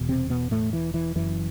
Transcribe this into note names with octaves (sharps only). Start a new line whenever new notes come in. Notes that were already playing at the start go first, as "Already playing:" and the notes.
Already playing: E1 E2 B2
C3 C4
B2 B3
A2 A3
E3
E3
F#1 F#2 E3